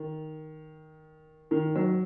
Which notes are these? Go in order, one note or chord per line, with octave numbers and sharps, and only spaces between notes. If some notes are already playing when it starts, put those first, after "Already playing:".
Already playing: D#3
D#3
F#3